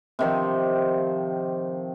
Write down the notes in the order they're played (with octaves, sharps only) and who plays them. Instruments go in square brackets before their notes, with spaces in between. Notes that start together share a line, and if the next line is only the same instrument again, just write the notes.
[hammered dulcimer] C3 D#3 F3